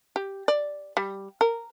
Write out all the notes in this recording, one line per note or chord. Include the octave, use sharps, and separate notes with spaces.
G4
D5
G3
A#4